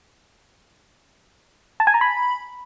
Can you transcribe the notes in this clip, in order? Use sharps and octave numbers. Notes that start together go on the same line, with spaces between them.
A5
G#5
A#5
B5